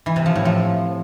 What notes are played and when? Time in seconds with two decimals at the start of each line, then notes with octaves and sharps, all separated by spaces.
0.06 E3
0.16 C3
0.26 F3
0.36 A2
0.45 F3